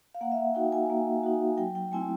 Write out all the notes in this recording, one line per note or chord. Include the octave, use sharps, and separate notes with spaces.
F5
A#3 F#5
E5
F5
D#4 F#4 G5
G#5
A#3
D#4 F#4
F#3 G5
G5
A3 C4 E4 G#5